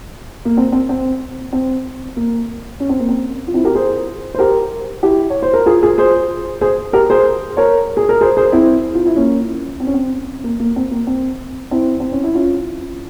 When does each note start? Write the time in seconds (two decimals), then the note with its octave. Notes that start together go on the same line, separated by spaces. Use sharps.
0.45 A#3
0.57 C4
0.72 C4
0.89 C4
1.53 C4
2.16 A#3
2.80 C#4
2.89 C4
3.00 A#3
3.09 C4
3.47 F4
3.54 C4 E4
3.65 G4 A#4
3.75 G#4 C5
4.34 C5
4.38 G4 A#4
5.03 E4 G4
5.30 C#5
5.42 C5
5.54 A#4
5.66 F4 G#4
5.83 F4 G#4
5.98 G#4 C5
6.61 G#4 C5
6.93 G4 A#4
7.10 G#4 C5
7.57 A#4 C#5
7.97 G#4
8.09 A#4
8.21 G#4 C5
8.37 G#4 C5
8.52 C4 E4
8.95 F4
9.06 E4
9.16 A#3 C#4
9.80 C4
9.87 C#4
9.94 C4
10.44 A#3
10.60 A#3
10.76 C4
10.91 A#3
11.07 C4
11.71 C4 E4
12.00 C4
12.12 C#4
12.24 E4
12.35 C#4 F4